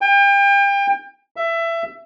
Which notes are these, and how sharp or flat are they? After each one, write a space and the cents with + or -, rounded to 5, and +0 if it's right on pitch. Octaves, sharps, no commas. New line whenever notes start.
G5 +35
E5 +20